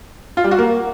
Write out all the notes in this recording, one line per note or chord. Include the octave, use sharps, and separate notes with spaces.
F4
G3
F#4
A#3